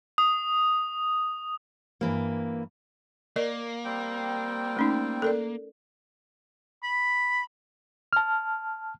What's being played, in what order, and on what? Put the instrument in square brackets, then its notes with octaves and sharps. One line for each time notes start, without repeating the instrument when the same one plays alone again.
[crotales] D#6
[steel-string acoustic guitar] G2 E3 A#3
[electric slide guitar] A#3 [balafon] A#4 D5 D#5
[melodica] G3 C4 G5
[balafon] A3 C#4 D#4
A4 A#4 D5
[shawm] B5
[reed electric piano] A5 F6